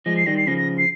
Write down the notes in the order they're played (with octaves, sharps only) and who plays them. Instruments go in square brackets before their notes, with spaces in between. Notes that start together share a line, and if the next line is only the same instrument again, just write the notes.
[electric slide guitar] F3 G#3 [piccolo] A#6
[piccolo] C7
[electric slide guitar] D#3 G3 [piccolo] A#6
[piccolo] C7
[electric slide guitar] C#3 F3 [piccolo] A#6
[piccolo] A#6
C7